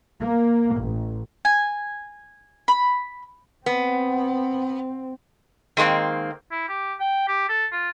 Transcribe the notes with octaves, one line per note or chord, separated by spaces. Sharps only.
A#3
A1
G#5
B5
B3 C4
D#3 G#3 A#3 C4
E4
G4
G5
G4
A4
F4